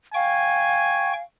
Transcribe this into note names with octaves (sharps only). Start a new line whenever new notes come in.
F5 G5 G#5 C#6